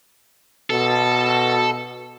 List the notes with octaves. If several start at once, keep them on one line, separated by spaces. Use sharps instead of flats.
B2 A4